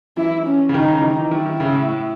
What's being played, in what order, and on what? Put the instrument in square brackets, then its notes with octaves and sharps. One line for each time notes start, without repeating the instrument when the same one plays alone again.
[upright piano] E3 [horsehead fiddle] E4
[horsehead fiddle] C#4
[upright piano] C#3
[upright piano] D#3 [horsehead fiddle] D#4
[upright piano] C#3
E3
D#3
E3
[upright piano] D#3 [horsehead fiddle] E4
[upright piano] D#3
C#3
A2
A2